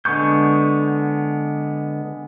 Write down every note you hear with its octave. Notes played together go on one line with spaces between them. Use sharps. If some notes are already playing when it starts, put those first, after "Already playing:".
D3 G#3 B3 C#6 G6